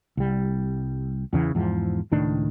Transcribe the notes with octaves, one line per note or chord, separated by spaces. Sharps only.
C2 G3
E2 C#3 E3
E2 G#2 F3
C#2 A2 D#3 D4